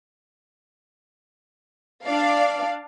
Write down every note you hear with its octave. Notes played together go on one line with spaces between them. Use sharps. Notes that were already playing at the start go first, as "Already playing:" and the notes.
D4 D5 F5